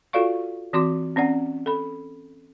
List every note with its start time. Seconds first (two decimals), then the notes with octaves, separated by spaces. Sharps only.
0.13 F4 F#4 A4 D5 F5 C#6
0.73 E3 C4 F#4 C6 D6
1.16 C4 C#4 D5 F#5
1.66 A4 B5